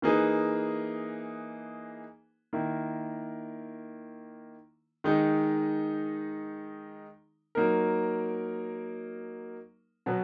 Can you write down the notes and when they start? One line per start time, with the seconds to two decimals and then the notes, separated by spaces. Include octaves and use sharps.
0.02 E3 A#3 D#4 G#4 B4
2.53 D#3 A#3 E4
5.04 D#3 G#3 D#4
7.55 F#3 A#3 D#4 A#4
10.06 B2 F#3 B3